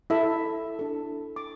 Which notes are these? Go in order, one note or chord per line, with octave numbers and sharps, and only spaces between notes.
E4 A4 E5
D4 A4
D6